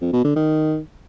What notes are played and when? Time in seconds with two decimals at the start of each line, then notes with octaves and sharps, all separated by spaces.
0.01 F2
0.13 B2
0.24 D3
0.36 D#3